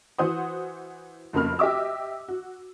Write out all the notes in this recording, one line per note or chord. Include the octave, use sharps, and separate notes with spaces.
E3 F#4 C5 F#5 D#6
F1 F2 C#3 A#3 B5 F6
G4 D#5 E5 D6 E6
F#4